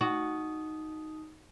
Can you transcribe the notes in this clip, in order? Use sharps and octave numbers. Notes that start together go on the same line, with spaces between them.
D#4 F#4 D#6